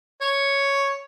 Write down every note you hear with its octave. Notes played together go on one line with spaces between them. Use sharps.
C#5